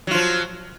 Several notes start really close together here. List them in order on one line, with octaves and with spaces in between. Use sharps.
F#3 F4 F3